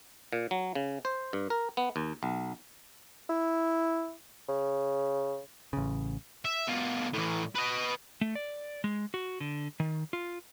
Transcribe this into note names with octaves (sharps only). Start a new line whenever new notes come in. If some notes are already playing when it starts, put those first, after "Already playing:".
A#2
F#3
C#3
C5
G2
A#4
B3
D#2
B1
E4
C#3
A1 C#3
E5
B2 F4
A2 E3
B4 D#5
A3
D5
G#3
F#4
D3
D#3
F4